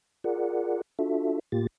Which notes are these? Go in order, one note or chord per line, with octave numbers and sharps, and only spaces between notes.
F4 G#4 A#4 D5 F#5
D4 F4 F#4 A4 E5
A2 A#3 F4 G4 A6